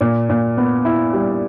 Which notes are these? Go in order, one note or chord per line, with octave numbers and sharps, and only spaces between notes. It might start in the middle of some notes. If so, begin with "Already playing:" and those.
A#2
A#2
B3
E4
G3